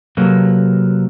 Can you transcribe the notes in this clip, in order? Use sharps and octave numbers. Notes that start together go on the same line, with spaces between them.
C3 F#3 A#3 A4 B4